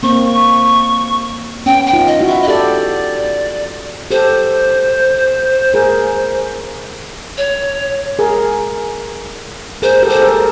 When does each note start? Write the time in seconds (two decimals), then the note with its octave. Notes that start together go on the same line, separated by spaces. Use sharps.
0.03 A#3 C4 C#6
1.66 B3 C#4 G5
1.86 G5
1.93 D#4 F4
2.07 D#5
2.21 E4 F#4
2.27 E5
2.42 D#5
2.48 G4 A4 D5
4.11 G4 A4 C5
5.74 G#4 A#4
7.37 C#5
8.19 G#4 A#4
9.82 G#4 A#4 C5
10.03 G4 A4
10.09 C5
10.16 A4
10.23 G#4 A#4